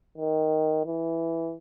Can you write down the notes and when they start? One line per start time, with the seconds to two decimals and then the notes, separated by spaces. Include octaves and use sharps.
0.18 D#3
0.85 E3